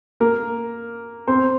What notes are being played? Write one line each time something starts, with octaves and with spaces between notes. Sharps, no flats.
A#3 A#4
C4 C5